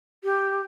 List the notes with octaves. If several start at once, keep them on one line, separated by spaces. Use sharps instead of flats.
G4